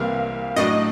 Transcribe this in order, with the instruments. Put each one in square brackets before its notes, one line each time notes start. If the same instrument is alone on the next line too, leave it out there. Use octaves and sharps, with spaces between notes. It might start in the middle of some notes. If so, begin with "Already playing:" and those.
Already playing: [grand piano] C2 C3 E3 G3 A#3 [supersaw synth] F5
[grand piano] A2 F#3 A3 D4 [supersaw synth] D#5